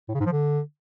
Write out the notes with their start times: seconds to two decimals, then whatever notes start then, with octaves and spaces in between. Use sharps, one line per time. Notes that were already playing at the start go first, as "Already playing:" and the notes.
0.09 A2
0.14 C#3
0.20 G#2
0.26 F3
0.32 D3